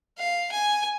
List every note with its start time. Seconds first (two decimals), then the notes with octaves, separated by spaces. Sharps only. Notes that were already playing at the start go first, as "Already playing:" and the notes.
0.18 F5
0.51 G#5